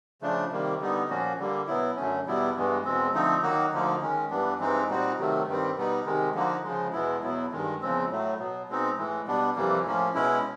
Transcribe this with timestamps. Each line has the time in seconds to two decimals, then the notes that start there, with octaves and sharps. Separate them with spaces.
0.22 C#3 F3 A3 D4
0.51 C3 D#3 G3 A#3
0.80 D3 G3 B3 D#4
1.09 A#2 F3 A#3 C#4 F#4
1.39 D3 G3 A#3
1.67 B2 F#3 B3 E4
1.97 F#2 D3 F#3 A3 C#4
2.26 E2 B2 G3 B3 E4
2.56 G2 E3 G#3 B3
2.85 E2 B2 G#3 C4
3.13 D3 F3 A3 C4 D#4
3.43 D#3 F#3 A#3 D#4 F#4
3.72 D2 D3 F3 A#3 D#4
4.02 D#3 G#3 C#4
4.30 G2 E3 G3 B3 D4
4.60 G2 E3 G#3 C4 D#4
4.89 A#2 G3 C4 D#4 F#4
5.18 C3 D#3 F#3 A3
5.47 G2 D#3 G3 C4
5.77 B2 G3 B3 D#4
6.06 C3 D#3 G#3
6.35 D3 F3 A#3 D#4 F#4
6.64 C#3 F3 G#3
6.93 E2 B2 G#3 B3 E4
7.23 E2 B2 F#3 B3 E4
7.52 G2 D#3 G#3
7.82 E2 C#3 F3 G#3 C4
8.10 A2 F#3 A3
8.39 B2 F#3 B3
8.69 B2 G#3 C4 D#4
8.97 A2 E3 G#3
9.27 B2 G3 B3 D4
9.56 F2 C3 E3 G3 A#3
9.85 A2 F3 A#3 C#4
10.14 B2 G#3 C#4 E4